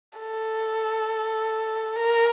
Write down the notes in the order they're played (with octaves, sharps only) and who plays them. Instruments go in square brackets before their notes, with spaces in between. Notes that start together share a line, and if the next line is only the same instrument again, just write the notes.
[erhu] A4
A#4